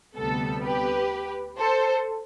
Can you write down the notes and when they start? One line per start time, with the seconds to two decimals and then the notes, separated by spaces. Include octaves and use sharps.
0.16 D2 C3 G3 B3 A4
0.63 G4 B4
1.58 A4 C5